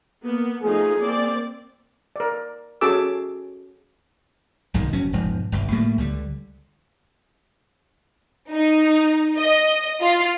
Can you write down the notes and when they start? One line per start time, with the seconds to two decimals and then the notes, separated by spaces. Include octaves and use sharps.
0.22 A#3 B3
0.63 F3 A3 D#4 G#4
0.99 A#3 C4 D5
2.16 A#4 D5
2.81 C#4 F#4 G#4 A4 D6 E6
4.74 B1 G#2 D#3 G#3
4.93 F1 F#3 C#4
5.13 E1 G#2 F3
5.52 G1 C2 G2
5.72 A2 G3 A3 A#3
5.98 C#2 D3 G3
8.52 D#4
9.39 D#5
10.01 F4